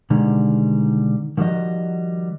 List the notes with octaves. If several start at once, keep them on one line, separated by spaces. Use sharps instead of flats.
B2 D3 D#3 G3 G#3
D#3 F3 G3 F#4 D#5